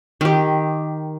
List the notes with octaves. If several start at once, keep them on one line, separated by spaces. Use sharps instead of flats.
D#3 G4